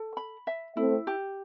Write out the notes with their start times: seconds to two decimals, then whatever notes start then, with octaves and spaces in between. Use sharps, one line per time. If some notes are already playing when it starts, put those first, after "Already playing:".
Already playing: A4
0.17 B5
0.47 E5
0.77 A3 C4 E4
1.07 G4